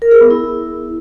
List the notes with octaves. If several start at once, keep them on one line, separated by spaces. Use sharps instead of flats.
A#4
G#4
B3
E4